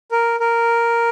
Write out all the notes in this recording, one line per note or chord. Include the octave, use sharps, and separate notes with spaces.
A#4
A#4